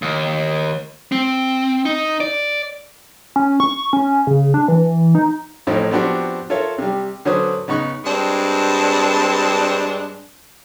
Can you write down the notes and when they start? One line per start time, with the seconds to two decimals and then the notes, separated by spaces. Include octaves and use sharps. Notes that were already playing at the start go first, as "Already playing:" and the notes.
0.02 D#2
1.12 C4
1.85 D#4
2.21 D5
3.36 C#4
3.60 C#6
3.93 C#4
4.27 C#3
4.54 D4
4.68 E3
5.15 D#4
5.67 A1 A2 F3 C4 D#4
5.91 F3 B3 C4 D4 F#4 G4
6.50 F4 A4 A#4 C#5 E5 F5
6.78 C3 G3
7.25 D3 F#3 C#4 B4 C5 D#6
7.68 C#3 B3 D#4 C#6 F#6
8.04 G2 G#3 C4 D4